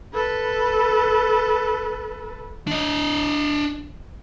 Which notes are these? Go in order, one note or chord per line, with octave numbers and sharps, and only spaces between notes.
A4 B4
D4 D#5